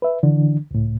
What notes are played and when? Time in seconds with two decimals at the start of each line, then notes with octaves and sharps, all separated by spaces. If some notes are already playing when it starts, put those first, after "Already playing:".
0.02 B4 E5
0.23 D3 E3 D4
0.71 C#2 A2